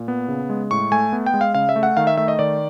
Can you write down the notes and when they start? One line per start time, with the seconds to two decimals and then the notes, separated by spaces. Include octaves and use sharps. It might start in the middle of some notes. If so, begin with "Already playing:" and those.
Already playing: A#2
0.08 B3
0.28 C#3
0.50 G#3
0.71 A2 C#6
0.92 A3 G#5
1.13 B3
1.26 G5
1.34 G#3
1.41 F5
1.55 C#3 F5
1.69 E5
1.76 A3
1.83 F#5
1.97 D#3 F5
2.07 E5
2.17 A3 E5
2.28 D#5
2.39 D#3 D5